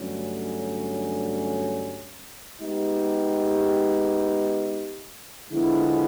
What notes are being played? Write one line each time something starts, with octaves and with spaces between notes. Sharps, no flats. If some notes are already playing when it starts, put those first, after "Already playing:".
Already playing: G2 D3 F#3 A3 C#4
G#3 B3 D#4 G4
D3 F3 G#3 B3 E4